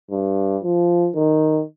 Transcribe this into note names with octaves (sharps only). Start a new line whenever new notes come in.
G2
F3
D#3